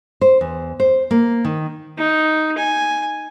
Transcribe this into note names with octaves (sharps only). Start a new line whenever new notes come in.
C5
E2
C5
A#3
D#3
D#4
G#5